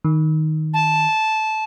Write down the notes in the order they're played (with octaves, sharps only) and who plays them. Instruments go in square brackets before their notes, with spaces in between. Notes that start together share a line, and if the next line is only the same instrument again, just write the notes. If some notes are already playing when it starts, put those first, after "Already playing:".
[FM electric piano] D#3
[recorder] A5